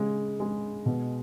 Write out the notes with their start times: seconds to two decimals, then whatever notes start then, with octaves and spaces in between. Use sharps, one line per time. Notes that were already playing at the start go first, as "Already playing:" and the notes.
Already playing: C#3 G#3
0.40 G#3
0.86 B2